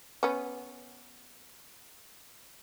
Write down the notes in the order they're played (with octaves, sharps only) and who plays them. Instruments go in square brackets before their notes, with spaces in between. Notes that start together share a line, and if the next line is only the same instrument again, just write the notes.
[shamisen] B3 C#4